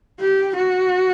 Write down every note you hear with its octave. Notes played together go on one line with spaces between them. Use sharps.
G4
F#4